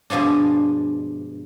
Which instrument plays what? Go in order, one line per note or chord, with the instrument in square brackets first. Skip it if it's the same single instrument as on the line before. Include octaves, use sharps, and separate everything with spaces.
[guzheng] G2 B2 F3 G#3 D4